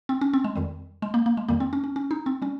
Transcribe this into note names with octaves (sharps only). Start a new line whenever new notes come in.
C4
C#4
C4
G#3
F2 D#3 G3
G#3
A#3
A#3
G#3
F2 D#3 G3 A#3
C4
C#4
C#4
C#4
D#4
C4
G3 C#4